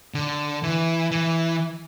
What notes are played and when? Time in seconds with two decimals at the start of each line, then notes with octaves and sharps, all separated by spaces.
0.14 D3
0.63 E3
1.11 E3